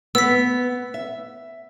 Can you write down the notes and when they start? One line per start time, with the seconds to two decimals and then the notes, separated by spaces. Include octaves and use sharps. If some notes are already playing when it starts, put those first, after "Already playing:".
0.15 B3 E6 B6
0.94 E5